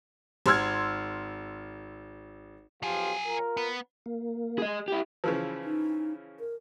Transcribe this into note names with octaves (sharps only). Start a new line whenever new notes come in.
G#1 C6 E6 F6 G#6
B1 F3 F#3 G4 G#4
F4 A#4
B3
A#3
G#4 D#5
E4 G4
C#3 E3 F3
D#4
A#4